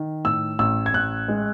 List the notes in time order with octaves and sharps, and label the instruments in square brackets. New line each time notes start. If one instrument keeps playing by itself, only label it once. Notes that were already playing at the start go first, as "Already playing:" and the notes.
Already playing: [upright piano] D#3
A2 E6
A1 E6
G#6
A1 F#6
G#3